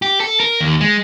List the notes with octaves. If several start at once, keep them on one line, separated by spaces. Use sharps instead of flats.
G4
A4
A#4
D#2
G#3